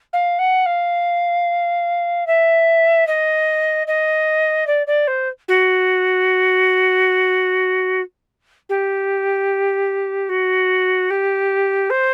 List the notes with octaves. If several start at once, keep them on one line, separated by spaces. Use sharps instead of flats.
F5
F#5
F5
E5
D#5
D#5
D5
D5
C5
F#4
G4
F#4
G4
C5